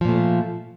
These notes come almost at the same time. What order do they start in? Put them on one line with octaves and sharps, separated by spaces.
F3 A#2 A3